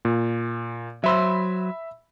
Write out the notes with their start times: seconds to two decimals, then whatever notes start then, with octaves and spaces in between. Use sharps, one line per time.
0.05 A#2
1.04 F#3 C5 E5 B5 E6